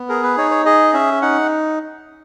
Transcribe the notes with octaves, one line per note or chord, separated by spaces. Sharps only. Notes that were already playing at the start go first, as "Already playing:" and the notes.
Already playing: B3
G#4 A#4
B4
D#4 C#5
C#5
G#4 D#5
C#4 E5
D#4 F#5